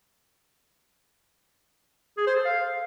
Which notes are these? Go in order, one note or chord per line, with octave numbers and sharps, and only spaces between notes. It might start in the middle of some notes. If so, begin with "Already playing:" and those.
G#4
C5
A4
F5